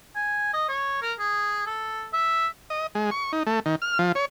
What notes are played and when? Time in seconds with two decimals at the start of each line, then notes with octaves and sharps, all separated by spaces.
0.16 G#5
0.54 D#5
0.69 C#5
1.02 A#4
1.19 G#4
1.66 A4
2.13 E5
2.70 D#5
2.95 G#3
3.11 C#6
3.33 D#4
3.47 A3
3.66 D#3
3.82 F6
3.99 F3
4.15 C#5